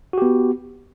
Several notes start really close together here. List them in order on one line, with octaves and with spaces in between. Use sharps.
F#4 G4 B3